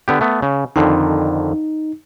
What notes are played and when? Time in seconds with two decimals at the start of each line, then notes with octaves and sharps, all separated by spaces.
0.08 D3 B3 G4
0.21 A3 B3
0.42 C#3
0.76 F2 D3 D#3 D#4